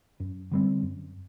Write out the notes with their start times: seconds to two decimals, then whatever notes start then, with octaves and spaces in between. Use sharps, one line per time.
0.20 F#2
0.51 D3 G3 C4
0.83 F#2